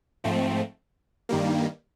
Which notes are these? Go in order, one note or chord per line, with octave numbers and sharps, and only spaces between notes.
G#2 F3 A3 C4
G2 D#3 G3 A#3